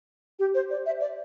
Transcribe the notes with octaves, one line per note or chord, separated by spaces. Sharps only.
G4
C5
D5
E5
D5